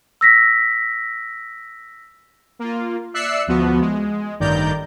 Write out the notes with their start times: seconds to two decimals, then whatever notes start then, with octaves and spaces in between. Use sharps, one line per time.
0.21 E6 A#6 B6
2.59 A#3 F4
3.14 D5 E5 E6 F#6 C7 C#7
3.47 D2 F3 B3 F#4
3.81 G#3
4.40 A1 G2 D#3 D5 A#5 G6